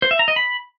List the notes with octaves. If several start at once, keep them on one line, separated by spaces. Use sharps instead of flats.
C5
E5
A#5
D#5
B5